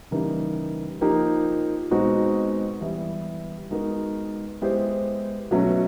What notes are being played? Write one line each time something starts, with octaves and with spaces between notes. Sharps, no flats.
C#3 E3 G3 A#3 D#4
F3 A#3 D#4 G4
B2 G#3 C4 D#4 F#4
E3 G3 B3 E4
G#3 B3 D#4 F#4 A#4
G#3 B3 E4 G4 C5
B2 F#3 A3 C#4 F#4